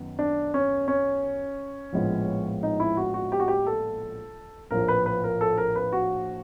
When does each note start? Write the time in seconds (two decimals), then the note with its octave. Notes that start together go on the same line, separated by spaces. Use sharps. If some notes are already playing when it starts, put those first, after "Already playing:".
Already playing: F#2 D#3 B3
0.19 D4
0.54 C#4
0.88 C#4
1.93 A#1 A2 F3 G#3 B3
2.63 D#4
2.80 E4
2.97 F#4
3.14 F#4
3.32 G4
3.40 F#4
3.48 G4
3.67 A4
4.71 A#1 A2 F3 A#4
4.88 B4
5.06 B4
5.24 A#4
5.41 A4
5.58 A#4
5.76 B4
5.93 F#4